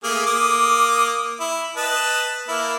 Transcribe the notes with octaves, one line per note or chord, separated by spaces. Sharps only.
A3 A#3 G#4
A#3 D6 D#6
E4
B4 D#5 A5
A#3 E4